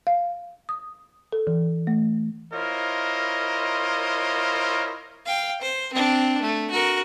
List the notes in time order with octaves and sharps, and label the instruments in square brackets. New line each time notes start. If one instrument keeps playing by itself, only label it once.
[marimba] F5
D#6
A4
E3
A3
[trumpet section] E4 F4 A#4 C5 C#5 D#5
[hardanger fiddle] F5 G5
C5
C4 D4
A3
F#4 A#4